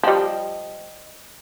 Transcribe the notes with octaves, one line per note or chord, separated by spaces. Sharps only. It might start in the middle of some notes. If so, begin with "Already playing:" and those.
F3 G3 D#5 G5